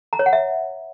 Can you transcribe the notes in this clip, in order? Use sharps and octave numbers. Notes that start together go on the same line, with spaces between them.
A#5
C#5
F#5
E5